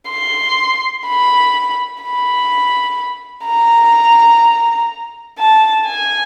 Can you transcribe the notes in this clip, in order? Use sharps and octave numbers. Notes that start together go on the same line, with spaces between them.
C6
B5
B5
A#5
A5
G#5